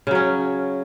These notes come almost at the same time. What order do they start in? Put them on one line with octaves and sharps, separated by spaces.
C#3 F#3 C#4